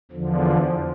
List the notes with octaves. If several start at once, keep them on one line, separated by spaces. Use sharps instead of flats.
E2 D3 F3